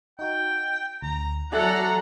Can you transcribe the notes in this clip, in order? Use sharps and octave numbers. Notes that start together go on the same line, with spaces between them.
D#4 F#4 G5
D2 A#5
F#3 F#4 A4 D5 E5 F#5 G#5 A#5